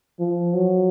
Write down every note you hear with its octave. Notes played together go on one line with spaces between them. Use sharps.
F3
F#3